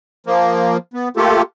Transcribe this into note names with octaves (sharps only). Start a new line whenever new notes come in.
F3 A#3
B3
A3 A#3 F4 G4 A4